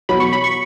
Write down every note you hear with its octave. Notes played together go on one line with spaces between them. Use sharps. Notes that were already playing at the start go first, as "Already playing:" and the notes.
E2 B2 F#3 B5
C#6
B5
C#6